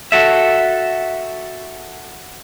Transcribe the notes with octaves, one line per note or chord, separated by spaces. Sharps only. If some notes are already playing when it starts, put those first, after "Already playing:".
F#4 A4 E5